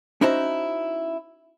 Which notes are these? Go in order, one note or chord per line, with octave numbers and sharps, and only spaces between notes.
C#4 D#4 E4 F#4 C5 A5